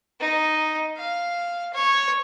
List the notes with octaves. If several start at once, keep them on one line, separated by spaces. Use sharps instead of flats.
D#4
F5
C#5